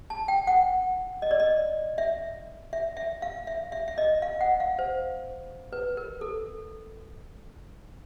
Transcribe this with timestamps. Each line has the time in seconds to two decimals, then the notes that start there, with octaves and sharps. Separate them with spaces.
0.10 A5
0.28 G5
0.47 F#5
1.22 D#5
1.31 D5
1.40 D#5
1.98 E5
2.73 E5
2.97 E5
3.22 F5
3.47 E5
3.72 E5
3.88 E5
3.98 D#5
4.22 F5
4.41 F#5
4.60 F5
4.79 C5
5.73 B4
5.97 A#4
6.21 A4